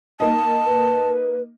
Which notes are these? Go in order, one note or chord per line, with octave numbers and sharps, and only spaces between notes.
A#3 D#4 D#5 A5
B4